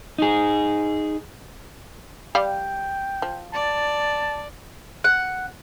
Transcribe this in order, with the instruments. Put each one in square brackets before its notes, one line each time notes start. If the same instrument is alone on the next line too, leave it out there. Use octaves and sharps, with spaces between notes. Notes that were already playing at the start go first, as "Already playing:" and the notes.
[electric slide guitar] D#4 G#4
[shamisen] G3 D5 F5 [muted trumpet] G5
[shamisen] F3
[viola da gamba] D5 [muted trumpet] A5
[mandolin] F#5